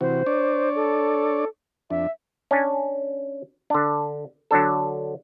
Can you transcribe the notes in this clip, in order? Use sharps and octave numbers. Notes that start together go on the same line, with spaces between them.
C3 E3 F#4 C5
D4 C#5 D5
A4
F2 D4 E5
C#4 D4 G#5
D3 D4
D3 F#3 D4 A4